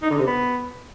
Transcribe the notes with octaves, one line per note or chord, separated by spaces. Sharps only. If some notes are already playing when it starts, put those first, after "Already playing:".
D#4
D3
C3
B3